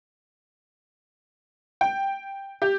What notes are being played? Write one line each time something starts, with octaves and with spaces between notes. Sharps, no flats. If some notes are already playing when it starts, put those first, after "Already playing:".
G5
G4